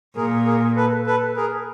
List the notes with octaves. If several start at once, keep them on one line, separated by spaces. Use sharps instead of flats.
A#2 G#4 A#4
G#4 A#4
A4 B4
A4 B4
G#4 A#4